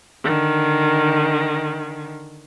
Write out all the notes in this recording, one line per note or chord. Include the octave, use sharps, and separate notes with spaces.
D3 D#3